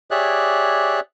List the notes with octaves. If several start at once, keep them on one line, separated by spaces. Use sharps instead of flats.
G4 G#4 C#5 D5 E5 F#6